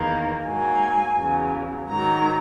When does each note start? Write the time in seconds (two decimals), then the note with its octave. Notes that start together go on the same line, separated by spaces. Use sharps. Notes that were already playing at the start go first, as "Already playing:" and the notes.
Already playing: E2 D#3 A#3
0.45 G#2 F#3 A#3 G#5
1.17 E2 C#3 F#3
1.88 G#2 D#3 F#3 A#5